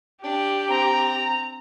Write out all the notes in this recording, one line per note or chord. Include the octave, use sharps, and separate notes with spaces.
D4 G4 G5
C4 A#5